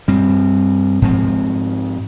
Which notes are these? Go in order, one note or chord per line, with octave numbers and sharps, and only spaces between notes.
G2 G3 C4
G#2 F3 C4